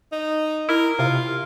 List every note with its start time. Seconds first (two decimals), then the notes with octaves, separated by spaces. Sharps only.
0.12 D#4
0.69 E4 A#4
0.99 C3 F4